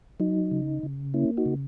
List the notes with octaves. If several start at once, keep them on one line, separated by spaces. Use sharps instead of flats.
F#3 D#4
C#3
C#3
A#3 C#4 E4
D#4 F#4
C#3